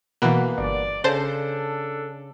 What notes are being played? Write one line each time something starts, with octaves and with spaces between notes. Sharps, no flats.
B2 E3 A#3 B4 F#5
G1 D5
C#3 D4 A4 C5 A5